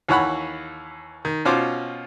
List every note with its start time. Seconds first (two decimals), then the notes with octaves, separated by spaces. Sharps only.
0.08 D#2 E3 C#5 F#5 B5
1.25 D#3
1.45 B2 C#4 F4 C5 D6